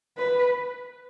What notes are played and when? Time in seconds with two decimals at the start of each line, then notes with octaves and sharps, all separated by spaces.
0.18 B4